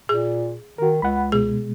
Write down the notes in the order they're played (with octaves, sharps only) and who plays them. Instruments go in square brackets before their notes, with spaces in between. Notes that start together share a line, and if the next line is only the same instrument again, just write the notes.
[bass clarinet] A#2 [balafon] G#4
[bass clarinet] D#3 [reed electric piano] F#4 A#4
[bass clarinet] C#2 [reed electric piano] F#5 B5
[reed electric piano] B2 G#3 [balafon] G#4